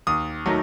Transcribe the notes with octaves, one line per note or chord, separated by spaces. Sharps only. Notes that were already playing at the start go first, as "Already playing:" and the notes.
D#2 D#6
D#3 F#3 A3 D#4